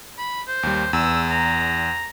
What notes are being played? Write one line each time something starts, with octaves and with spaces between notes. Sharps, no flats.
B5
C5
D#2 G3
E2 E6
A#5